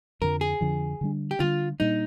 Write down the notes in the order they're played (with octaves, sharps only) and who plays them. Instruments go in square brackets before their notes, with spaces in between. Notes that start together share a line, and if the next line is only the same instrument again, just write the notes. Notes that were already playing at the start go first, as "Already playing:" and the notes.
[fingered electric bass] F2 D3 F3 [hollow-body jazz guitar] A#4
[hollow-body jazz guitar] G#4
[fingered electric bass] F2 D3 F3
D3 G3 D4
[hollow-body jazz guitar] G4
[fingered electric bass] D3 G3 D4 [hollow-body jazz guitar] F4
[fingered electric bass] A#2 G3 A#3 D4 [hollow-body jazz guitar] D#4